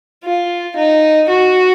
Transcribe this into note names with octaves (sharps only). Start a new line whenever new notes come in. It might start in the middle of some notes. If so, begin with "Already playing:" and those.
F4
D#4
F#4